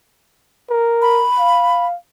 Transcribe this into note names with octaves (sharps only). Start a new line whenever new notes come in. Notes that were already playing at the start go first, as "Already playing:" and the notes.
A#4
B5
F5